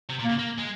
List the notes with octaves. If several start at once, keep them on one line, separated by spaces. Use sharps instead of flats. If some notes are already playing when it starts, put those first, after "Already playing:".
C3
A#2
A#3
C#3
A#3
G#3